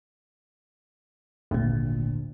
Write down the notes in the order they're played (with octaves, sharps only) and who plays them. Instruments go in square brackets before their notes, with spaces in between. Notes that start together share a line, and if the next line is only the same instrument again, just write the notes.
[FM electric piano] G#1 A#2 [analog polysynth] D2